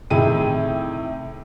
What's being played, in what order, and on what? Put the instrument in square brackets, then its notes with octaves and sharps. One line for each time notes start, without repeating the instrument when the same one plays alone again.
[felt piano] A2 C3 D#3 G#4 G5 D#7